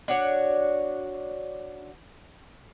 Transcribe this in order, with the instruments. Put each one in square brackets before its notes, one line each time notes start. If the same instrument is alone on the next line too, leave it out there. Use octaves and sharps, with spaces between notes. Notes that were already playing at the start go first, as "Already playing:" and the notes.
[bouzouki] D4 F#4 C#5